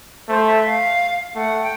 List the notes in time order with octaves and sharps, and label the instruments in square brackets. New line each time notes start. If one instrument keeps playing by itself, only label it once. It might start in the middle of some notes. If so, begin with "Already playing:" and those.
[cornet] A3 [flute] C5
[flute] E5
F5
[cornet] A3 [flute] F#5
[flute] G5